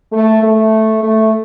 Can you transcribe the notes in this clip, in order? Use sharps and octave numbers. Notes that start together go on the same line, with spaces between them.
A3
A3
A3